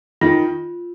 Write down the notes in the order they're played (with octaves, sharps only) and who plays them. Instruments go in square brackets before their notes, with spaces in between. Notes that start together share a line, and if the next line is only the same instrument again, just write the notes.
[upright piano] D#3 [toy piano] F4